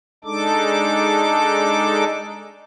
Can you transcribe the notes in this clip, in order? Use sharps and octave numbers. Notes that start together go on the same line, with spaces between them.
G#3 D4 D#4 A4 D6